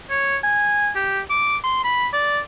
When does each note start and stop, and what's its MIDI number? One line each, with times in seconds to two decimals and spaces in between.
0.10 0.37 73
0.43 0.90 80
0.95 1.20 67
1.30 1.57 86
1.64 1.79 84
1.84 2.07 83
2.13 2.39 74